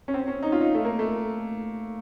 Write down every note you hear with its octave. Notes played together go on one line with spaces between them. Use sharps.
C#4
C4
C#4
D#4
F4
D#4
A3
A#3
A3